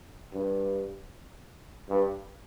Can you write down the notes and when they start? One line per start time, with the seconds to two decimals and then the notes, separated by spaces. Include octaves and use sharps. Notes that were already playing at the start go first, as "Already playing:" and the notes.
0.33 G2
1.89 G2